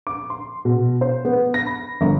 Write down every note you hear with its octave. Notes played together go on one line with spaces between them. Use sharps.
D6
C6
B2
C5
B3
A#6
B5
G1